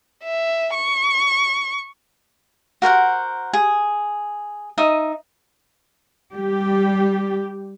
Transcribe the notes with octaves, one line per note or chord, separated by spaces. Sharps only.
E5
C#6
F#4 A#4 C5 F#5
G#4
D#4 E5 D#6
G3 G4